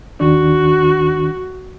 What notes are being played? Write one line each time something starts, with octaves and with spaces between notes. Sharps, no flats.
D#2 D#3 D4 F#4